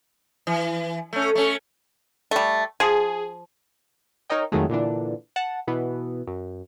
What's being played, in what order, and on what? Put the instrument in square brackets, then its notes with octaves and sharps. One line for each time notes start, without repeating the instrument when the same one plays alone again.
[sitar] E3
A3 C#4
A3 C#4
[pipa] G3 A3
[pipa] F3 [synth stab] G#4
[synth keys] D#4 A#4 C#5 D#5 G5
F2 D#3 F#3 G#3 A3
A#2 D3 E3 D4
F#5 A5
B2 E3 B3
F#2